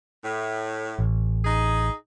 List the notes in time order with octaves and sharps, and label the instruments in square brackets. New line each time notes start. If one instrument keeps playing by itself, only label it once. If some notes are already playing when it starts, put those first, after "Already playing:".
[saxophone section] A2
[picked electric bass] A1
[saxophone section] D#4 G#4